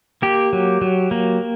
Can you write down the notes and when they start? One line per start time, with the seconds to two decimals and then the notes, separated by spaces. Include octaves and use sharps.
0.22 A#3 G4
0.53 F#3
0.81 F#3
1.11 A#3